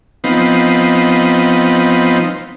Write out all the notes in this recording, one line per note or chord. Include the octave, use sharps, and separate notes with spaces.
F3 B3 C4 D#4